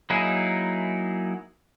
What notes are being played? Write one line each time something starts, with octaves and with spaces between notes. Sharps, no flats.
F#3 A#3 D#4 E4 G#4